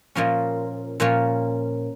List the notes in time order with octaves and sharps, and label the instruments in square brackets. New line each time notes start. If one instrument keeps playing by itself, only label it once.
[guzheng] A#2 F3 A#3 C#4
A#2 F3 A#3 C#4